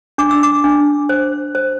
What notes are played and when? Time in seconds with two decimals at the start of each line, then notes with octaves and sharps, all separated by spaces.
0.18 D4 D6
0.31 E6
0.43 D6
0.64 D4
1.09 C5
1.55 C5